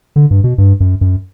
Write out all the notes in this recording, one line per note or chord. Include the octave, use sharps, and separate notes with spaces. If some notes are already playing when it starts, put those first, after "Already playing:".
D3
G2
B2
G2
F#2
F#2